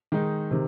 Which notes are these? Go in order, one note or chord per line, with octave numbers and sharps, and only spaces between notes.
D#3 G#3 D#4
C3 D#3